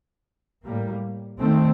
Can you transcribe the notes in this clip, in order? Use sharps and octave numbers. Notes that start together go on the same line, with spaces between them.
A2 G3 A#3
D#3 A3 C4